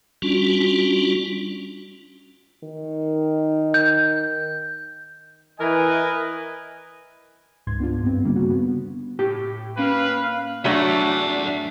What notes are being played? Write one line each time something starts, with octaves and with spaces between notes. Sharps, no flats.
G3 C#4 D4 F4 F#4
D#3
G6
E3 A#4 B4 D#5 G#5
C#2 G#2 C6 G#6
B3 D4 F4
G2 B3 C4
D3 G3 A#3 D4
C#3 F#4
B3
A2 G4
A#3 C#4 B4 F5
F#3 A3 D4 E5 F#5